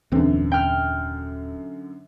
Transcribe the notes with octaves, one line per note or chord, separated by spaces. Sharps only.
D#1 F#2 D3 E3 C4
G5 F6